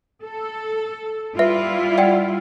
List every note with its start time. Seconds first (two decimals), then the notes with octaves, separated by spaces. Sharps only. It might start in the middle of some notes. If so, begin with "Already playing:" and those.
0.22 A4
1.39 G3 E4 F4 B4 E5
1.98 D5 F#5 G5